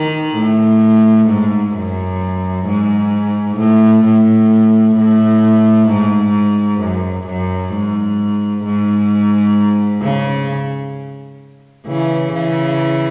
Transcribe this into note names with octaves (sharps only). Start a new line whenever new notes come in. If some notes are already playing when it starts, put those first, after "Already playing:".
Already playing: D#3
A2
G#2
F#2
G#2
A2
A2
A2
G#2
F#2
F#2
G#2
G#2
C#3
C#3 E3
C#3 E3